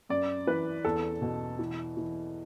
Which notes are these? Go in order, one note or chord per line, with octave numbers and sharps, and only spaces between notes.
F#2 D5
E3 B4
E2 A4
B2
E3
E3